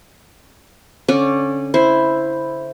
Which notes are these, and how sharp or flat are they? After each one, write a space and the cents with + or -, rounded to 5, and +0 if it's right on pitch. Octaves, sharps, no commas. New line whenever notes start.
D3 -30 C#4 -20 D5 -10
E4 +0 C5 +0